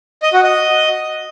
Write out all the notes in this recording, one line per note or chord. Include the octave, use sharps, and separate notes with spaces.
D#5
F#4
D#5